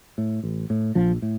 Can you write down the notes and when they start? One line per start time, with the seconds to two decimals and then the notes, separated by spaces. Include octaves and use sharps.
0.18 A2
0.43 A1
0.70 A2
0.95 A#1 F3
1.22 A2